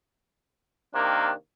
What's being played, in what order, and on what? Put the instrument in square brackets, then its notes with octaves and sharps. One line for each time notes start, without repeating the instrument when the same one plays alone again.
[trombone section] C3 D#3 A#3 [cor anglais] D4